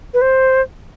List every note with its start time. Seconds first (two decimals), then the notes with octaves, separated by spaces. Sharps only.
0.14 B4
0.22 C5